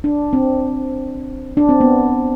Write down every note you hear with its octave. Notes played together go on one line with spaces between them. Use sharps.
D4
C4
D4
C4
B3